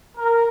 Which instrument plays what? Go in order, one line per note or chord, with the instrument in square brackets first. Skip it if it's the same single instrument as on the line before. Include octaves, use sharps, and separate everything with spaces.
[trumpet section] A#4